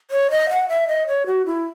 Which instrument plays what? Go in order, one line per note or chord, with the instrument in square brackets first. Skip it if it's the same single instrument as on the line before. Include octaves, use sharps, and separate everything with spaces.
[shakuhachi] C#5
D#5
F#5
E5
D#5
C#5
F#4
E4